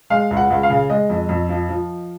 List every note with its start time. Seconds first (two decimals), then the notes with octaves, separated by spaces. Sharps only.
0.10 G#3 F5
0.31 C#2
0.37 F#5
0.50 C#2
0.63 F5
0.70 C#3
0.90 G#3 D#5
1.10 F2
1.29 F2
1.49 F3
1.69 F3